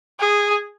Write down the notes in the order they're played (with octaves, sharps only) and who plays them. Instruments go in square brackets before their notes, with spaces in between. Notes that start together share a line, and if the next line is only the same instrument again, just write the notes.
[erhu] G#4